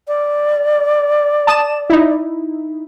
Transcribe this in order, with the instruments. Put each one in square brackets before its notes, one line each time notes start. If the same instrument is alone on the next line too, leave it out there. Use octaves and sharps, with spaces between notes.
[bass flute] D5
[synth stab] A5 D#6 E7
D#4 E4